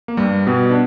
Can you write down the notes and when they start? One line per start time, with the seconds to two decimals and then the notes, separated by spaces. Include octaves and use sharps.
0.08 A#3
0.17 G2 G3
0.47 B2 B3
0.70 D4